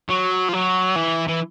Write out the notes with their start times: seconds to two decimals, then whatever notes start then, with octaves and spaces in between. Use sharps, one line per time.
0.09 F#3
0.49 F3
0.53 F#3
0.96 E3
1.28 E3